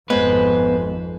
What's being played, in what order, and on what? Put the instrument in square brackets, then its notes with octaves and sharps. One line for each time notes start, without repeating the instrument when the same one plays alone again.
[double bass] G#1 F2 [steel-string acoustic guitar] G#3 [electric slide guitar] B3 C5 [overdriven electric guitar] B4